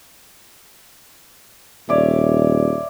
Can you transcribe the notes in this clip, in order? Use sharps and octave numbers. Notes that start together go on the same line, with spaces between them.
D#1 C#5 D5 E5